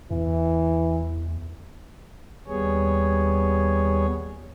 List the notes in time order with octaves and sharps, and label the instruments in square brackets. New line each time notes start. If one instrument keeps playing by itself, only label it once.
[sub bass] E2 [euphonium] E3
[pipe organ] D#2 G3 B3 G#4 C#5